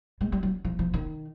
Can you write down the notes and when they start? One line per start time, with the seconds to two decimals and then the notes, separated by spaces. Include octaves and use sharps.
0.21 G#3
0.32 G3
0.43 F#3
0.65 F3
0.79 F3
0.94 D#3